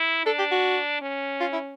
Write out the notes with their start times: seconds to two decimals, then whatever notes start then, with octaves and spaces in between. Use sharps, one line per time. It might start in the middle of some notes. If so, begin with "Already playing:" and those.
Already playing: E4
0.26 D4 A4
0.39 G4
0.51 F#4
1.02 C#4
1.40 F4
1.53 E4